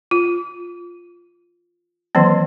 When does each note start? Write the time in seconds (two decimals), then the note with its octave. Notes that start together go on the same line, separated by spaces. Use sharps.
0.11 F4
2.15 D#3 E3 F#3 A#3 C4